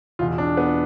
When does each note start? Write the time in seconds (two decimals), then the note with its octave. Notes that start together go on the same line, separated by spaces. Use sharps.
0.19 E2 B2 F4
0.38 D4
0.57 B3